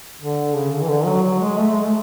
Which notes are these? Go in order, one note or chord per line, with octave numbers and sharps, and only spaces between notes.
D3
C#3
D3
E3
D3
F#3
F#3
G#3
A3
G#3
A3